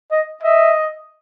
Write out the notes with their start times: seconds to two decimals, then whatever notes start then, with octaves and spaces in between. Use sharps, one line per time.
0.11 D#5
0.43 D#5 E5